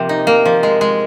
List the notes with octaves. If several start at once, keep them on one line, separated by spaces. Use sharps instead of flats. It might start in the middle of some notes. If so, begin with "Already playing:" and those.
Already playing: C3 F3 A#3
D#4
A#3
F3
G#3
G#3